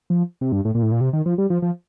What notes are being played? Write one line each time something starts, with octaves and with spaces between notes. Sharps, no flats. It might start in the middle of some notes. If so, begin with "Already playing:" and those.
F3
C3
G2
A2
A#2
A2
A#2
C3
D#3
F3
G3
F3
F3